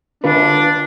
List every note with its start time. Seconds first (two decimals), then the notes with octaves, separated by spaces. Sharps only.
0.24 D3 D4 F4 B4